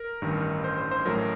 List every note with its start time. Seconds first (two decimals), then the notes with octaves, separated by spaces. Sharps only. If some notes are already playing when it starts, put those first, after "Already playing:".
Already playing: A#4
0.22 A1 G2 D#3
0.64 C5
0.77 C5
0.91 C5
1.05 A1 A2 F#3 A#4